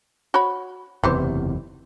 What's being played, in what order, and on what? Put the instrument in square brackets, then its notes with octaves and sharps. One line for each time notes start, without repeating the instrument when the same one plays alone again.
[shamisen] F#4 C#5 B5
[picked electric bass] F#1 E2 C3 [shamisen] E3 G4 C5